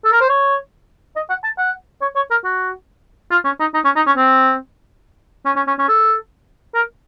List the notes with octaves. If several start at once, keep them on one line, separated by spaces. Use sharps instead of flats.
A4
A#4
C5
C#5
D#5
F#5
A5
F#5
C#5
C#5
A#4
F#4
F4
C#4
D#4
D#4
C#4
D#4
C#4
C4
C#4
C#4
C#4
C#4
A4
A#4